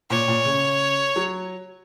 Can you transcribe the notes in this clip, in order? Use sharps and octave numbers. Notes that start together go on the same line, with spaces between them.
A#2 C#5
A#2
C#3
F#3